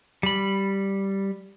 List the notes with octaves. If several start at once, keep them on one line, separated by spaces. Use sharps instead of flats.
G3 B5